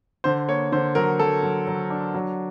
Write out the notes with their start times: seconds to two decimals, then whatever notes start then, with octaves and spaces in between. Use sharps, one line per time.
0.24 D3 C5
0.48 A#3 C#5
0.72 D3 C5
0.95 F#3 A#4
1.19 F#3 A4
1.43 F#3
1.67 F#3
1.90 D4
2.14 F#3